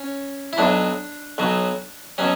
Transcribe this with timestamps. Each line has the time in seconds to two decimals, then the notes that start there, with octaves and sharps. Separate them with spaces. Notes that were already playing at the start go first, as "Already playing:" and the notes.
Already playing: C#4
0.53 E4
0.58 B1 B2 F#3 D4
1.38 B1 B2 F#3
2.18 B2 F#3 C#4